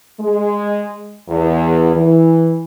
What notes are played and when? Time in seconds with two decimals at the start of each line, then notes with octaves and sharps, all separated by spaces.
0.21 G#3
1.29 E2
1.95 E3